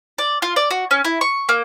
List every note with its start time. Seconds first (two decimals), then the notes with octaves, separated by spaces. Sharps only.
0.18 D5
0.42 F4
0.56 D5
0.71 F#4
0.91 C#4
1.05 E4
1.21 C#6
1.49 A#3